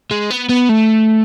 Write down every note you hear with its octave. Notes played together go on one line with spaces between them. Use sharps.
G#3
B3
B3
A3